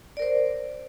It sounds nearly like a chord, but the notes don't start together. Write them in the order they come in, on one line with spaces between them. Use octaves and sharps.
D5 A#4 C5